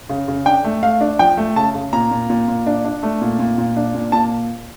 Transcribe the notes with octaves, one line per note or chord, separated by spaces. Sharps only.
C#3
C#3
D4 G5
A3
A3 F5
D4
F3 G5
A3
C#3 A5
C#3
A#2 A#5
A#2
A#2
A#2
D4
D4
A3
A#2
A#2
A#2
D4
A#2
A#2 A5